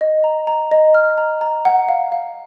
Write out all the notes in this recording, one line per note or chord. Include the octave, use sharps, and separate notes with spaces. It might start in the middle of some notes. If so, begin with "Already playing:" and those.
D#5
A#5
A#5
D#5
F6
A#5
A#5
F#5
F5
F5